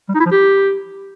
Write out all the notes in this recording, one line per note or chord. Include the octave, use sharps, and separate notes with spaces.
G3
D#4
E4
F3
G4